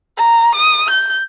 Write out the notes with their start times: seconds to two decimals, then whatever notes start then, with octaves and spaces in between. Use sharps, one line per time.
0.18 A#5
0.56 D#6
0.91 G6